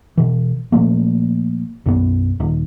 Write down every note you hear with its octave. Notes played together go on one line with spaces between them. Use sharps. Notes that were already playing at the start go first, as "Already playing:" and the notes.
B2 E3
A#2 F3 A3 A#3
B1 F#2 B3
D#1